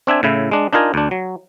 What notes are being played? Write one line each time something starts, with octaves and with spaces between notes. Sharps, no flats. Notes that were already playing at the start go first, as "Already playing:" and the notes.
C4 D4 E5 G#5
A2 C#3 E4
G#3 D4
D4 D#4 F4 A#4 G#5
D2 D4
F#3